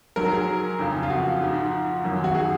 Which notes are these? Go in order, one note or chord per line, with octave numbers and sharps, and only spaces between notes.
G#2 F#3 A#4
G#4
F2 C#3 F3
F4
F#4
G#2 F3
F#2 D#3 F#3
F#4
G#4